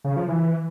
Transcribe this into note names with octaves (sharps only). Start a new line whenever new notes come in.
C#3
F3
E3